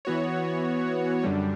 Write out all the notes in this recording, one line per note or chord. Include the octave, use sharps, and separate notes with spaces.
E3 B3 F#4 C#5
F#2 D3 G3